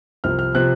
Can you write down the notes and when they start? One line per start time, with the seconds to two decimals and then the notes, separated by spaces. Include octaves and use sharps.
0.24 C2 C3 F3 F6
0.39 F6
0.55 C3 F3 F#6